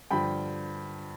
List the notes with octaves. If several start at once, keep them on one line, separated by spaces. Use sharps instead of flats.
G2 D3 F3 G5 B5